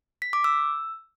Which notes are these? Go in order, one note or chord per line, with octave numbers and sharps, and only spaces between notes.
B6
D6
E6